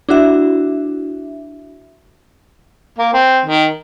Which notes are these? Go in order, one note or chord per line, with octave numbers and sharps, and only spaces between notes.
D4 E4 F#4 E5
A#3
C4
D#3